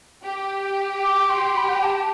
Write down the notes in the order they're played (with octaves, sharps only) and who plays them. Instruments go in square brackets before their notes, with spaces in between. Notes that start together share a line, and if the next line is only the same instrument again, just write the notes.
[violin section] G4
[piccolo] D6
C6
B5
F#5
G5
A5